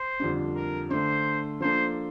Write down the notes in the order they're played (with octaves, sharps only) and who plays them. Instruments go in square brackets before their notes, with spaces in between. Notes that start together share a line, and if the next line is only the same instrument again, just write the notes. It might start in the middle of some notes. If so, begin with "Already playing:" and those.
Already playing: [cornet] C5
[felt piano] F2 D3 G3 D4
[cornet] A#4
[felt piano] D3 A3 D4 [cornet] C5
[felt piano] F3 A#3 D4 A4 [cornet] C5